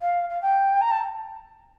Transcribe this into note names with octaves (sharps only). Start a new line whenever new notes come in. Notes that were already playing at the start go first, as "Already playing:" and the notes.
F5
F5
G5
A#5
A5